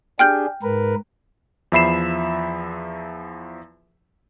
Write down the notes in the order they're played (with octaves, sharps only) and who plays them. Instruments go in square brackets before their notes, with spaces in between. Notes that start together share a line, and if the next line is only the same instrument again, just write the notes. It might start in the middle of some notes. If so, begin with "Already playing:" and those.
[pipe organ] D4 G4 G#4 [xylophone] G5 F6 G6
[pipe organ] G#2 A#4 B4
[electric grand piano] E2 F3 E5 B5 C7 E7